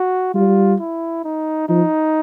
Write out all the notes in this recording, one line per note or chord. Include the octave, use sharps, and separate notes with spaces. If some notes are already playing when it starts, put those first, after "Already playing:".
Already playing: F#4
G3 F4
E4
D#4
F3 D#4